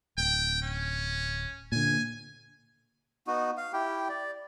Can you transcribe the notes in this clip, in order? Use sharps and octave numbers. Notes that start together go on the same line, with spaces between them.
D1 G5
C#4
A#2 D3 G#5
B3 D#4 F#4
F5
E4 G4 G5
D5